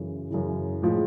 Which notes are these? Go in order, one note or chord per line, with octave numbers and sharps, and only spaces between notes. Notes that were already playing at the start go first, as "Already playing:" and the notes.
Already playing: F#2 C#3 E3
F#2 C#3 E3
A2 F3 G#3